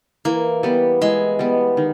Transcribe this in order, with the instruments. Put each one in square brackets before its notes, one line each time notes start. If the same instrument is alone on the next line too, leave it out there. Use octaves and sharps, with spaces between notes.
[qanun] E3 [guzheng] A#3
[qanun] G3 B3
[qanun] E3 [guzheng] G#3
[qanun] G3 B3
D#3